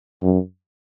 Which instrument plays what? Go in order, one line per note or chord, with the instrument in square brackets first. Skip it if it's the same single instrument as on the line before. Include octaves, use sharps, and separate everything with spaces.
[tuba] F#2